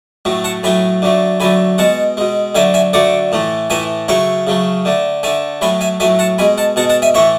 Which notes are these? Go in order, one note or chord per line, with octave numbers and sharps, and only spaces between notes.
A2 F#3 A3
F#5 A5
A2 F#3 A3 G#5 B5
D3 F#3 A3
D3 F#3 A3 G#5 B5
B2 G#3 F#5 A5
B2 G#3
D3 F#3 A3 E5 G#5
E5 G#5
D3 F#3 A3 D5 F#5
A2 E3 A3
A2 E3 A3 E5 G#5
C#3 F#3 A3 C#5 E5
C#3 F#3 A3
D3 A3
D3 A3 E5 G#5
A2 F#3 A3 G#5 B5
E5 G#5
A2 F#3 A3 E5 G#5
F#5 A5
B2 G#3 G#5 B5
F#5 A5
B2 G#3 F#5 A5
F#5 A5
E5 G#5
A2 E3 A3 C#5 E5